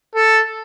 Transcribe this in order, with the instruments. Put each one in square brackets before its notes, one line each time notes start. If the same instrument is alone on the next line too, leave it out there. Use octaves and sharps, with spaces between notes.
[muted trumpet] A4